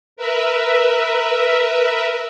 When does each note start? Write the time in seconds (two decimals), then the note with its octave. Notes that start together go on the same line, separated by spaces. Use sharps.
0.17 A#4 B4 E5